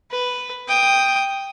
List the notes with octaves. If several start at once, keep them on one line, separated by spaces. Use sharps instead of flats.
B4
G5 D#6